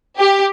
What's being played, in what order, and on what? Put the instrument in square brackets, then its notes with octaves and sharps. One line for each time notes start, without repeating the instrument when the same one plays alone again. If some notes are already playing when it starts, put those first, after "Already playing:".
[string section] G4